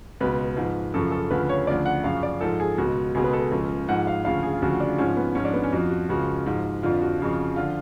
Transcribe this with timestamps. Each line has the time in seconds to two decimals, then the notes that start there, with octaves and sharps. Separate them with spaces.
0.21 C#2 B2 B4
0.57 G#2 F3
0.94 F#2 C#3 F3 A4
1.12 A4
1.31 D2 C#3 F3 B4
1.49 C#5
1.67 D2 C#3 F3 D5
1.86 F#5
2.04 F#2 C#3 F3 F5
2.23 D5
2.41 G#2 F3 A4
2.60 G#4
2.78 C#2 B2 F#4
3.15 C#2 B2 G#4
3.24 B4
3.33 A4
3.51 C#2 C#3 F3
3.89 G#2 F3 F#5
4.07 F5
4.25 D2 C#3 F3 F5
4.43 G#4
4.53 F4
4.62 D2 C#3 F3 F#4
4.80 D4
4.98 G#2 F3 C#4
5.17 B3
5.35 G#2 F3 C#4
5.45 D4
5.53 B3
5.64 C#4
5.72 F2 F3 F#4
5.90 F#4
6.09 C#2 C#3 F3 F#4
6.46 G#2 F3
6.83 F2 D3 F3 F4
7.02 F#4
7.20 F2 C#3 F3
7.56 D3 F3 F4